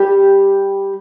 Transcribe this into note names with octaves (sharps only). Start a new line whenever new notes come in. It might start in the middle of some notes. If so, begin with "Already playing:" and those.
Already playing: G3 G4